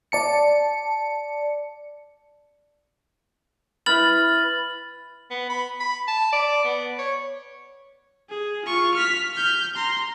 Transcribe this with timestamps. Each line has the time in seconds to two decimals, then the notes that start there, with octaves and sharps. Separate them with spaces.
0.12 D5 A5 C#7
3.86 E4 B4 B5 F6 A6 F#7
5.31 B3
5.50 B5
5.80 B5
6.08 A5
6.32 D5
6.64 B3
6.99 C#5
8.29 G#4
8.65 F4 C#6
8.94 F6 B6
9.33 F6 G6
9.75 A#5 C6